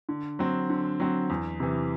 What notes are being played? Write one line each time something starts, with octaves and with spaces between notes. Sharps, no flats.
D3
F#3 C4
D3
F#3 C4
E2
C3 E3